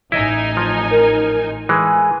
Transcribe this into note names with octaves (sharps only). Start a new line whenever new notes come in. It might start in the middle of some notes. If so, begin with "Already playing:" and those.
A1 D#4 E4 D#5 G#5
F3
A#4
E3 G#3 G#5